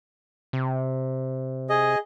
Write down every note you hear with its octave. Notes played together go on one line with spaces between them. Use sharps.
C3
G#4 D#5